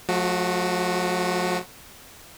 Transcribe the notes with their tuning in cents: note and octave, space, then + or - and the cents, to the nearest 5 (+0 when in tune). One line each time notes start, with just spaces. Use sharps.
F3 +40 A3 -30 F#4 +0